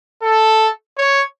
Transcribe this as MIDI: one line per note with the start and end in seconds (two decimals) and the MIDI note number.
0.23 0.69 69
0.98 1.24 73